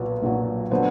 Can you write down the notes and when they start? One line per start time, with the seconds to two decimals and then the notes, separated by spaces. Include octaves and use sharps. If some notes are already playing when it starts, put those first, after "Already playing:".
Already playing: B1 A#2 F#3 B4
0.22 B1 A#2 F#3
0.71 D3 F#3 B3 C5